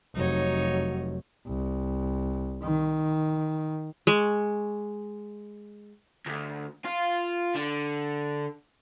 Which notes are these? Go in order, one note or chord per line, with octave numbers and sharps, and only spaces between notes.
F1 F#3 D#4 C#5
C2
D#3
G#3 C#6
D2
F4
D3